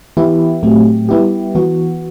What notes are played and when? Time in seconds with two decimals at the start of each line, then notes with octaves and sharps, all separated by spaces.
0.17 E3 B3 E4 G4
0.63 A2 F#3 A3 C4 G4
1.09 G3 B3 E4 G4
1.55 E3 B3 F#4